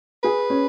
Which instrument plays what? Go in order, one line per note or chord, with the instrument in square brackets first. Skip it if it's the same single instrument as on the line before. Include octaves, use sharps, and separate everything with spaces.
[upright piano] G#4 [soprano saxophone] B4
[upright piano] C#4